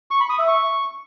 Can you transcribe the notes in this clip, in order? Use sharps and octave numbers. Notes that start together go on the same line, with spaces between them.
C#6
B5
D#6
E5
C#6